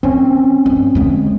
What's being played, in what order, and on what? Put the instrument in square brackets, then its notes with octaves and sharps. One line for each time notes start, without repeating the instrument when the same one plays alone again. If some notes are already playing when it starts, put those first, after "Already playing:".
[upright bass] D#3 [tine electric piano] C4 C#4
[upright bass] G2
D3 G#3